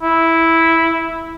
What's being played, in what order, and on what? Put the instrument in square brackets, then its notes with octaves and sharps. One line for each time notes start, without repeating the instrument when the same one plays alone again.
[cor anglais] E4